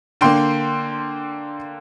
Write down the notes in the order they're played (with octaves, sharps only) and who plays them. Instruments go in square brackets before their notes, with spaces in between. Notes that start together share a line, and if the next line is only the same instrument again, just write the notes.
[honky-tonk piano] D3 A#3 G5 C6